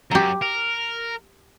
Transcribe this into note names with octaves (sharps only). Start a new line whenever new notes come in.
F#2 G4 A#5
A#4